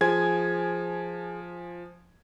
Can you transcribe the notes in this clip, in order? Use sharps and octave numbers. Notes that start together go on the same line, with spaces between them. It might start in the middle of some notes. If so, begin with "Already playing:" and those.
F3 G#4 C5 G#5 G#6